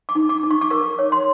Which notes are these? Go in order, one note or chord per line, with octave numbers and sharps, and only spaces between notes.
D6
D#4
D6
D#4
C#6
D6
A#4 C#6
C#5
C6